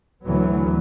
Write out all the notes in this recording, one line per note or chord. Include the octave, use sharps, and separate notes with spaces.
D2 E3 F#3 B3